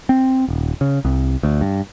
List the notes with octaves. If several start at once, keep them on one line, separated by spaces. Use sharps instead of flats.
C4
D#1
C#3
C2
D2
G2